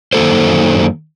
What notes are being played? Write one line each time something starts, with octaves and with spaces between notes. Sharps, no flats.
F#2 D#3 A#3 A4 C5